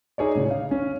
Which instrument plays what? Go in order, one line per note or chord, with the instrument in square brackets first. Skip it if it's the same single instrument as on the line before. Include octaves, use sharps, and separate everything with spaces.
[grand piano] D#4 G#4 C#5 D5
A2 C#3
F5
C#4